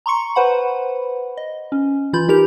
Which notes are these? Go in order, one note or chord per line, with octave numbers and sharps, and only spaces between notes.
A#5 C6 C#6 C#7
B4 C5 F#5 B5
D#5
C#4
E3 F4 B5 G6
E3 D#4 G4 A#4 G6 F7